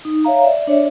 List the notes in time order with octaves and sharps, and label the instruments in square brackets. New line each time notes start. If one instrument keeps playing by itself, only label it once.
[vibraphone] D#4
C#5 E5 F5 A#5
D5 E5
D4 C#5 D5 E5